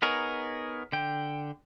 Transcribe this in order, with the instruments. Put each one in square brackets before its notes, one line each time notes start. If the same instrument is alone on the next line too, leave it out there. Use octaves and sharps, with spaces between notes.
[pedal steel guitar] B3 D#4 G#4 A#4 C#5
D3 G5